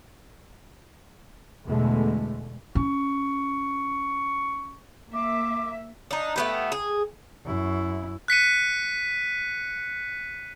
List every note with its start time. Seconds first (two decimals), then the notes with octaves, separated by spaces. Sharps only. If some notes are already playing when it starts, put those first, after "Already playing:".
1.65 E2 B2 D3 G#3 A3
2.75 C#4 C#6
5.13 A#3 E5 D6
6.11 D4 D#4
6.36 A3 B3 G4
6.72 G#4
7.45 F#2 E4
8.28 F#6 B6 C#7 D#7